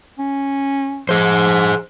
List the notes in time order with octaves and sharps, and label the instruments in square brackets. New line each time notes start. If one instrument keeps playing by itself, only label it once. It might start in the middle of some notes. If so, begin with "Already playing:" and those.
[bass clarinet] C#4
[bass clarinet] F3 [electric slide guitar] G#4 C5